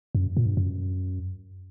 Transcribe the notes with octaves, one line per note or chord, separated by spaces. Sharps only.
F#2
A#2
G2
F#2